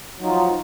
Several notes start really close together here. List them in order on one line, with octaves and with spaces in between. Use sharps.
F#3 D#4 F4 F3